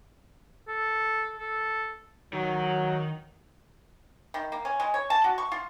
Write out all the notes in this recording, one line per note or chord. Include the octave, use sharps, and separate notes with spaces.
A4
A4
D#3 F#3
D#3
A#3
C#4
G#3
C#5
A5
F#4
C#6
F4